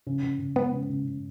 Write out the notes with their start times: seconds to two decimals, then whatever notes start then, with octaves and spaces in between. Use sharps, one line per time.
0.07 C#3
0.23 C#3
0.39 C#3
0.56 G#3 B3
0.73 C#3
0.89 C#3
1.05 C#3